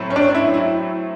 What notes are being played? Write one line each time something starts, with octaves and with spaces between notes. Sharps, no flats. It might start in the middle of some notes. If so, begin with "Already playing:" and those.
Already playing: A2 F#3 A3 C4
C#4
D4
E4
E4